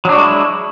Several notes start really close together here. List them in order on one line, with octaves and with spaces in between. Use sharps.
F#3 D4 F#4 G#3 E4